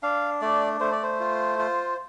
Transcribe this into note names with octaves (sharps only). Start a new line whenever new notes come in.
D4 F5
A3 D5
A3 C5
D5
C5
F4
F4